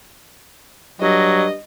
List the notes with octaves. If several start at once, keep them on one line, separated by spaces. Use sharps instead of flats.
G2 F#3 D#5